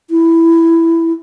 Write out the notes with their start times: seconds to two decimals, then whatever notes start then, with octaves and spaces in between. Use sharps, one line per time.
0.10 E4